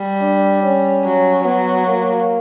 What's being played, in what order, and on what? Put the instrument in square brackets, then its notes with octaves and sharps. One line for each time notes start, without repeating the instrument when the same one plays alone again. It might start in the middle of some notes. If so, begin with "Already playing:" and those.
Already playing: [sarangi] G3
[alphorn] D4
C#4
[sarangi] F#3
[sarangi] F#3 [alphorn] B3
[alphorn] A#3